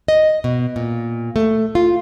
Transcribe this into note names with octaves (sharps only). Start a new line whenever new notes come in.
D#5
B2
A#2
A3
F4